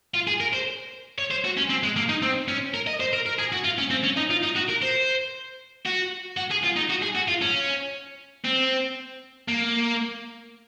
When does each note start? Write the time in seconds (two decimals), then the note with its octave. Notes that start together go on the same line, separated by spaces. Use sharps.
0.14 F4
0.27 G#4
0.40 A#4
0.53 C5
1.19 C#5
1.31 C5
1.45 F#4
1.58 C#4
1.70 C4
1.84 G#3
1.96 A#3
2.09 D#4
2.22 C4
2.48 C#4
2.74 A#4
2.87 D#5
3.00 C5
3.13 A#4
3.26 A#4
3.39 G#4
3.52 F#4
3.64 F4
3.78 C#4
3.91 C4
4.04 C#4
4.17 D#4
4.30 F4
4.43 D#4
4.55 F#4
4.69 A#4
4.82 C5
5.86 F#4
6.37 F#4
6.51 G#4
6.63 F4
6.76 D#4
6.89 F#4
7.02 G#4
7.15 F#4
7.28 F4
7.41 C#4
8.45 C4
9.48 A#3